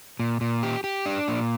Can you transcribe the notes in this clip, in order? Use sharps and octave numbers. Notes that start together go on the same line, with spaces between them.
A#2
A#2
G4
G4
D4
A#2